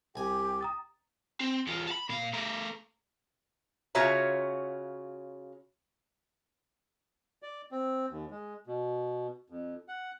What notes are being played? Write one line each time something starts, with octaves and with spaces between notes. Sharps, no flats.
C2 G4 G5 G#5
A#5 D#6 A6
C4
E2 F4
A5 B5
A#2 F5
A3 A#4
C#3 F4 F#4 C#5 E5 A#5
D5
C4
D#2
G#3
B2
F2
F#5